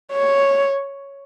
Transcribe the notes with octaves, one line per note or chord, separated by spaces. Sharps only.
C#5